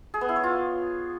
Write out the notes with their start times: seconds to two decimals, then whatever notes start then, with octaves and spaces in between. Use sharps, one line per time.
0.14 G#4
0.21 B3
0.29 E4
0.36 C#5
0.43 F4